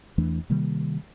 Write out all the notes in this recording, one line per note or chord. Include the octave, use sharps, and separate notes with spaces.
E2 E3 A3 D4
C3 D#3 G3 A#3